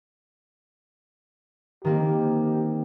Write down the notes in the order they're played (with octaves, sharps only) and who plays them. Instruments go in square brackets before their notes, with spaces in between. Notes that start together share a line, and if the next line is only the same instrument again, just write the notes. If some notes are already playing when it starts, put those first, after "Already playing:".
[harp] D#3 A#3 C4 [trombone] G4